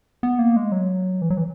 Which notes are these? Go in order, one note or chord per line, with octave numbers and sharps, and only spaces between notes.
B3
A#3
G#3
F#3
E3
F#3
E3